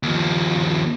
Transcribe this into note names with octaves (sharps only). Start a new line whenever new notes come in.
D#2 F3